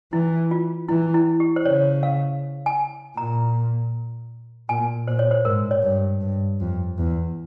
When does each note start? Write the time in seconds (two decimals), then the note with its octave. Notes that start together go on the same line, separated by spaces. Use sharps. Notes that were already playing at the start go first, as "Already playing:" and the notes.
0.12 E3 E4
0.51 F4
0.89 E3 E4
1.14 E4
1.40 G4
1.56 C5
1.65 C#3 C#5
2.03 F5
2.66 G#5
3.17 A#2 A#5
4.69 A#2 G#5
5.08 A#2 C5
5.19 C#5
5.31 C5
5.45 G#2 A#4
5.71 C#5
5.83 G2
6.21 G2
6.60 F2
6.98 E2